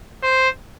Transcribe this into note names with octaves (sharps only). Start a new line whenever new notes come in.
C5